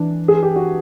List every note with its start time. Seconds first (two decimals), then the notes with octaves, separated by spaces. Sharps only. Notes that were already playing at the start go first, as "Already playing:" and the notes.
Already playing: E3 D4
0.28 G#4
0.43 G4
0.56 F#4